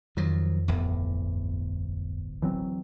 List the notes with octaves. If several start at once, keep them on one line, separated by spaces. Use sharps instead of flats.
F2 D#3 F3 F#3
D1 G1 E2
E3 F#3 C4